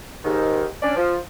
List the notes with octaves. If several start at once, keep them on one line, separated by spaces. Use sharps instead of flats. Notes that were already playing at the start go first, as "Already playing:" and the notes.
D#2 G#2 D#3
C#4 D4 D5
F3